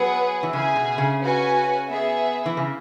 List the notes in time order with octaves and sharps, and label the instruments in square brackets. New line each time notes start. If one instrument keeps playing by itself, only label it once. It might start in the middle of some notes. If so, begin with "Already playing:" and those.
Already playing: [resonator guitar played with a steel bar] F#3 [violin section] B3 G#4 B4 F#5
[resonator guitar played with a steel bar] E3
[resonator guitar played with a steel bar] C#3 [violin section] G#4 E5 G#5
[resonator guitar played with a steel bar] B2
C#3
[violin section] C#4 F#4 B4 G#5
B3 G#4 E5
[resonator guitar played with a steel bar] E3
C#3